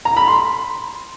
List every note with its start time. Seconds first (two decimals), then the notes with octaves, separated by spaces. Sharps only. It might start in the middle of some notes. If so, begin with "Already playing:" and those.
0.05 A#5
0.17 B5
0.28 C6